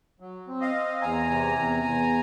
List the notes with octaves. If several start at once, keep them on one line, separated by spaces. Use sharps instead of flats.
F#3
C4
D#5 F5
C4
E2 G#5 A#5
C3
E2
E2